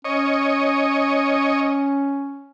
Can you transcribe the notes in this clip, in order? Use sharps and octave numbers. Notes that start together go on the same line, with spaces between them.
C#4 C#5 D#5